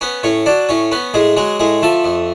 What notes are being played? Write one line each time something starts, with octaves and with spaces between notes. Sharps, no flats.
B3 C#4 B4
A2 C#4 C#5
F#3 D4 D5
A2 C#4 C#5
B3 C#4 B4
A2 G#3 G#4
F#3 G#3 G#4
A2 G#3 G#4
F3 A3 A4
F2